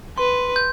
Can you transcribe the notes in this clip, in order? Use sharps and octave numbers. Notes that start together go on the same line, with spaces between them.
B4 C6
G6